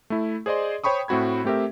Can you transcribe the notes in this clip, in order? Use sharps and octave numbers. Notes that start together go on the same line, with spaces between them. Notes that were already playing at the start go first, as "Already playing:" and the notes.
A3 E4
G#4 C5 D5 D#5 C6
C5 C#5 G5 B5 C#6 D#6
A2 A3 C4 F#4 B5 G#6
A3 C4 G4 A#4 E5